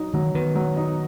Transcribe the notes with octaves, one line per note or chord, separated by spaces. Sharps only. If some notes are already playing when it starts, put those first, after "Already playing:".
Already playing: F#3 D#4
D#3 F#3
D#3 B3
F#3
D#4